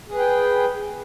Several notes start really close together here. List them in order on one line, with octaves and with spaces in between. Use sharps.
G#4 B4 G5